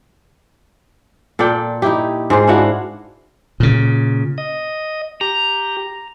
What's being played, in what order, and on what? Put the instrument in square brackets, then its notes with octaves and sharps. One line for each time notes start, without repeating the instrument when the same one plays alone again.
[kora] A#2 A4 D5 G5
D#4 E4 G4
G#2 G#3 C5
D4 E4 F#4 F5
[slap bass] A#2 C#3
[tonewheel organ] D#5
[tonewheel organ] G4 [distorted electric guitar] A#5